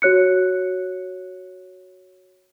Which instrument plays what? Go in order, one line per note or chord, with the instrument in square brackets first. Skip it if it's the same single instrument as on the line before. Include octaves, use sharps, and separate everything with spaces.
[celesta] F#4 C#5 F#6 C#7